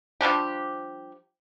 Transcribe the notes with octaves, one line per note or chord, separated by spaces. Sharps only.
F3 G3 D4 G4